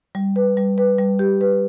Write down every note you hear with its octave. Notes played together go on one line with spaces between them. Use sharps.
G3
B4
G3
B4
G3
G4
B4